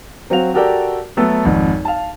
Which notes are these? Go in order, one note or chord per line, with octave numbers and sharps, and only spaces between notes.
F#3 C4 F#4 F5 F7
F#4 G4 A4 A#4 D5 G5
F#3 A3 B3 A4
G#1 F2
F5 A5